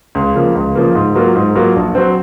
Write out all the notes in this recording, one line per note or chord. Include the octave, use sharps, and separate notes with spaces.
C#2
C#3 F3 A#3
C#2
C#3 F3 A#3
G#2
F#3 A#3 F4
G#2
F#3 A#3 F4
A#1
F#3 C4